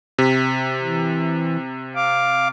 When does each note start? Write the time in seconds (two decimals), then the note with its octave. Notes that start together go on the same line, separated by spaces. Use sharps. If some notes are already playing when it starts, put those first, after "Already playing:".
0.18 C3
0.82 E3
1.95 F5 D6